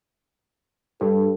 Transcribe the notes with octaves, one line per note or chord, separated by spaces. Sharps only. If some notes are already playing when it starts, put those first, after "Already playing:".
G2 A4